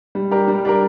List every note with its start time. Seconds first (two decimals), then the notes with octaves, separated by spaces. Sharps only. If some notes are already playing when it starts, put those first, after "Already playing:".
0.15 G3
0.31 D4 G4 A#4
0.48 G3
0.65 D4 G4 A#4